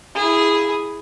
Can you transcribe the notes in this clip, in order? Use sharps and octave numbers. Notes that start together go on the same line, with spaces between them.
E4 G#4